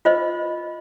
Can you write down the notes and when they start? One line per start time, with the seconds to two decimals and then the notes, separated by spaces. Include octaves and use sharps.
0.05 F4 B4 C5 D#5